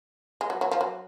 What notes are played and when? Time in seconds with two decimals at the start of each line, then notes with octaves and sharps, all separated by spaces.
0.41 G#3
0.50 F#3
0.61 F#3
0.71 F3
0.81 F#3